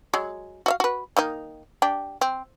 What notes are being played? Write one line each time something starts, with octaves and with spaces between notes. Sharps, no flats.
F#3 G#3
F#4 E5 F5
F#4 B4
D#3 A#3 D#4
D4 G4
C4